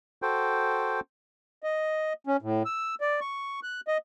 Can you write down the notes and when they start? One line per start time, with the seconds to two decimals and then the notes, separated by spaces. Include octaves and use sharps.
0.22 F#4 A4 C5 G5
1.63 D#5
2.27 C#4
2.42 A2
2.66 E6
3.01 D5
3.21 C#6
3.63 F#6
3.88 D#5